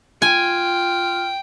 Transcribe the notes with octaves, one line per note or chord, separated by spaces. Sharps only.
F4 G5 G#5